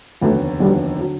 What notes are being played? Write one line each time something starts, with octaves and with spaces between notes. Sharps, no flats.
F1 D#2 D3 F#3 A3 B3
F1 D#2 D3 F#3 G3 B3
D3 F#3